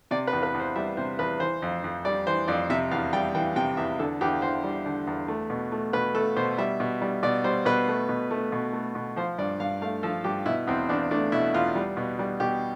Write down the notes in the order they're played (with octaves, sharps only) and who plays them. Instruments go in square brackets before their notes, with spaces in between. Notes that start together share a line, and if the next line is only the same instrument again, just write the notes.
[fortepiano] C3 D5
B4
E2
B4
E2
C5
G3 E5
C3 C5
E2 B4
E3 C5
F2
F2
G3 D5
E3 C5
F2 D5
C3 E5
E2 F5
G3 G5
E3 G5
C3 G5
E2 E5
D3 A4
E2 G4
E2 C5
G3
D3
E2
A3
B2
A3
B2 B4
A3 A4
B2 C5
G3 E5
B2
G3
B2 D5
G3 C5
B2 B4
A3
B2
A3
B2
A3
B2
F3 C5
G2 D5
G2 F5
A3 F5
F3 A4
G2 G4
B2 E4
E2 C4
E2 D4
A3 D4
B2 E4
E2 F4
G3
B2
G3
B2 G4